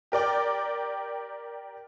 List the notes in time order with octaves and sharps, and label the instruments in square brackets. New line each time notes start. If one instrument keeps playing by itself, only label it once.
[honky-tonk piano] G4 A#4 D5 G5